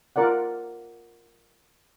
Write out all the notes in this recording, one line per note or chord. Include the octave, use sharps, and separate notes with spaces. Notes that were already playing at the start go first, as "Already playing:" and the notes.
F4 A#4 D5 F#5